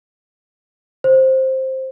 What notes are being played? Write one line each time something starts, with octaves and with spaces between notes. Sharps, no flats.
C5